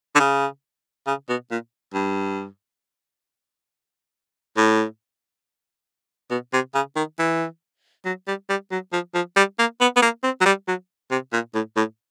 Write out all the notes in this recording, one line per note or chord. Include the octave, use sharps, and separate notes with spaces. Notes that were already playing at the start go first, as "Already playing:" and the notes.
D3
C#3
C#3
B2
A#2
G2
A2
B2
C3
C#3
D#3
E3
F#3
G3
G3
F#3
F3
F3
G3
A#3
B3
B3
A#3
C4
F#3
G3
F#3
C3
A#2
A2
A2